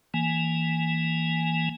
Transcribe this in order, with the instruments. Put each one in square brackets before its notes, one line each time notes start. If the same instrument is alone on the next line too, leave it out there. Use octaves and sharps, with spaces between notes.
[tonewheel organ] E3 A#3 G#5